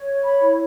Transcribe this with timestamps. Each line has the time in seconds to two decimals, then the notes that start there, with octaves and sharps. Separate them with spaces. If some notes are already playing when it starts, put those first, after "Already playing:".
Already playing: C#5
0.23 B5
0.39 E4